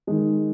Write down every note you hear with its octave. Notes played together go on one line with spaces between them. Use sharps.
D#3 G#3